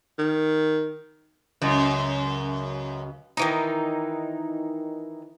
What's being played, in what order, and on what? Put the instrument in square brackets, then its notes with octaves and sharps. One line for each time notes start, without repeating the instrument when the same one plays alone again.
[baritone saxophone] D#3
[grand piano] C#2 [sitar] F#2
[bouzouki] D#3 E3 D#4